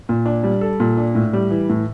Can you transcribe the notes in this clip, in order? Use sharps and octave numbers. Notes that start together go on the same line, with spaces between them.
A#2
D4
G3
A4
A#2
D4
A2
G3
E3
A2